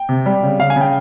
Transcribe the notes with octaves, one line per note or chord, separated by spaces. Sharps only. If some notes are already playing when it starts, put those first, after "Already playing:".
Already playing: G5
C3
G3
C#3
C#3 F5
G#5
C#3
G5